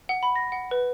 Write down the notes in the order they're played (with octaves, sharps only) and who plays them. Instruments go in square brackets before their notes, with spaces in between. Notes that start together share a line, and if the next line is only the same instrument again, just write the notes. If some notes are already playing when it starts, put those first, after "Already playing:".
[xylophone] F#5
B5
A#6
F#5
B4